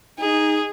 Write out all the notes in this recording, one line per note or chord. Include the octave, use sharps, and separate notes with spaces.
D#4 G#4